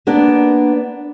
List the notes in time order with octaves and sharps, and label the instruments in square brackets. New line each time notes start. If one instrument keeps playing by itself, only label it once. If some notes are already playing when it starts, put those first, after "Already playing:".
[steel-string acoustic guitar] A#3 B3 D4 D5